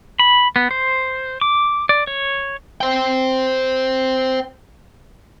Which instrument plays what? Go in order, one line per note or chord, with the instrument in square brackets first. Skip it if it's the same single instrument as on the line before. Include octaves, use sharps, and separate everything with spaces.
[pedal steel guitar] B5
B3
C5
D6
D5
C#5
[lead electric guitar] C5 G5